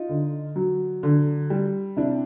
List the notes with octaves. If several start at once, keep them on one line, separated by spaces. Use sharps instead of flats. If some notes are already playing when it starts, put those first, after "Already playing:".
Already playing: D#4 F4
D3
F#3
D3
G3
C3 D4 E4